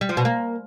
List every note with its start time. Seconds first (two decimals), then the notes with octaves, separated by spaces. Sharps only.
0.01 G3
0.09 F3
0.17 B2
0.25 A#3